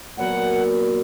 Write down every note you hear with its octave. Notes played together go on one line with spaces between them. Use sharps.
A#2 F#3 B3 F#5